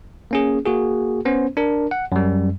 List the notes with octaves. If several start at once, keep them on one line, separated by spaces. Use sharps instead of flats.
A#3 C#4 G#4
A#3 F#4 G#4
B3 C#4 C5
D4 A#4
F#5
F#2 G3